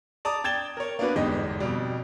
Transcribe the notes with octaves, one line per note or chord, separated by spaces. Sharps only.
D5 A5 A#5 D6 D#6
G5 G#6 A6 E7 G7
A#4 C#5
A#3 B3 D4 F#4 B4
G1 E2 G#2 D#4 G4 D#5
F2 B2 G3